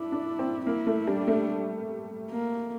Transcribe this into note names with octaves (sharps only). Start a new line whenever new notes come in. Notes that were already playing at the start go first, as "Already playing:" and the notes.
Already playing: D4 E4
D4
C4
A#3 E4
A3
G3 D4
A3
A#3